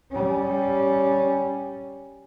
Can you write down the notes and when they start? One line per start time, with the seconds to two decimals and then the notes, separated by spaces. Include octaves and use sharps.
0.11 G3 C#4